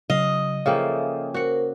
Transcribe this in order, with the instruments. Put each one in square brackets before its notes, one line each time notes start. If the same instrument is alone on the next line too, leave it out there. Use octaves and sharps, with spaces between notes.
[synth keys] C#3 F#3 [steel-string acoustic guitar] D#5 [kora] F5
[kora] C#3 F3 A#3 [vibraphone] A4 E5 [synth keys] F5 G5 G#5
[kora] F#4 F#5 [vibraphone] A#4 C5